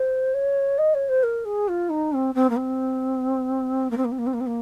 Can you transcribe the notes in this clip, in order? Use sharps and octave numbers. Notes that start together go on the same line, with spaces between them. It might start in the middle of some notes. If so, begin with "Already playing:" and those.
Already playing: C5
C#5
D#5
C#5
C5
A#4
G#4
F4
D#4
C4
C4
A#3
C4
A#3
C4
A#3
C4
A#3
C4
A#3
C4
A#3